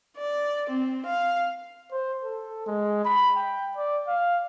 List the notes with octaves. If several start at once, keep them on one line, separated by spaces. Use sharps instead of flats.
D5
C4
F5
C5
A4
G#3
B5
G5
D5
F5